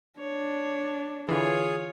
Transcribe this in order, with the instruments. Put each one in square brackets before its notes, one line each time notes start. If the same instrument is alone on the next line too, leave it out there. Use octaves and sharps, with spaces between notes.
[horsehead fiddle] D4 [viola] C#5
[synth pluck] D3 E3 [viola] F4 C#5 [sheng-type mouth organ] G#4